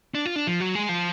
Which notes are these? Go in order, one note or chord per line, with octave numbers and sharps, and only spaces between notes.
D4
F4
D4
F3
F#3
G#3
F3